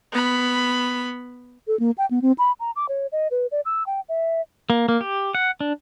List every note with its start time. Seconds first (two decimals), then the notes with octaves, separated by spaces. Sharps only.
0.12 B3 B5
1.67 A4
1.79 A#3
1.98 G5
2.11 B3
2.22 C4
2.38 B5
2.60 A#5
2.76 D6
2.89 C#5
3.12 D#5
3.31 B4
3.51 D5
3.65 E6
3.86 G5
4.09 E5
4.70 A#3
4.89 A#3
5.01 G4
5.35 F#5
5.61 D4